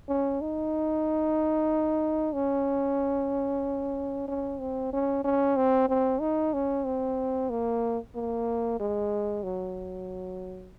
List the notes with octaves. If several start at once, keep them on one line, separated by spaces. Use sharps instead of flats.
C#4
D#4
C#4
C#4
C4
C#4
C#4
C4
C4
D#4
C#4
C4
A#3
A#3
G#3
F#3